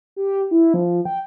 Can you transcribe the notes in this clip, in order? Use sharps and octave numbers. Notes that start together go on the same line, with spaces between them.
G4
E4
F3
G5